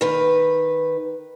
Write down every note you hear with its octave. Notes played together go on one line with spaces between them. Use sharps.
D#3 B4